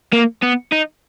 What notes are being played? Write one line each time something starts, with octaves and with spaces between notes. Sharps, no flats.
A#3
B3
D#4